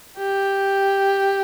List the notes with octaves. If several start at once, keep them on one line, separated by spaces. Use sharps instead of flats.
G4